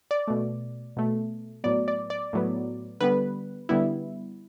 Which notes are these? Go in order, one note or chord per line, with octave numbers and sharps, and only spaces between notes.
D5
B2 A3
B2 A3
A2 F#3 B3 D5
D5
D5
A2 F#3 B3
D3 G3 B3 B4
D3 G3 B3 E4